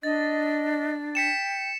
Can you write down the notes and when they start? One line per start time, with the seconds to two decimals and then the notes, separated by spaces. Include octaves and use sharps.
0.03 D4 D#5 A6
1.15 G5 B6 C#7 E7